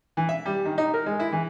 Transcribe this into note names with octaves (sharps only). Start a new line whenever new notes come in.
E3
E5
G3
D#3
D#4
A#4
G#3
E4
E3